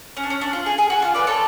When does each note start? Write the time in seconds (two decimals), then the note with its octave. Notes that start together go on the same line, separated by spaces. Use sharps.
0.17 C#4
0.23 D4
0.30 C#4
0.41 D4
0.53 F4
0.66 G#4
0.78 G#4
0.90 F#4
1.02 F4
1.14 B4 D5
1.27 A4 C#5